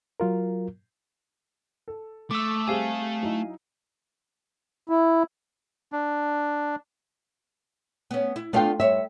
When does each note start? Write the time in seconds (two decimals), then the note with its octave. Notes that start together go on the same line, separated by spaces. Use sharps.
0.20 F#3 F4 A#4
1.88 A4
2.31 A3 D6 E6
2.68 G3 C4 G#4 F5 G#5
3.23 F#3 D#4 E4
4.89 E4
5.92 D4
8.11 B3 C#4
8.36 E4
8.53 A3 B3 D4 F4 F5 G5
8.80 G2 C#5 E5